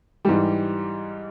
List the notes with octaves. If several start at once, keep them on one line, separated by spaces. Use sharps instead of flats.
G#2 E3 G3 G4